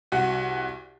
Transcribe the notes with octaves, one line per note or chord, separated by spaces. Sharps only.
C2 F#4